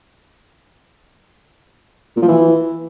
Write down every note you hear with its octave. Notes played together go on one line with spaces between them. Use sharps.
A#2
F3
E3